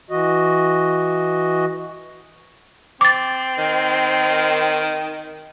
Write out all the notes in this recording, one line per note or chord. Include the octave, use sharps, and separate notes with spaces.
E3 F#4 D#5
C4 D6 A6
D#3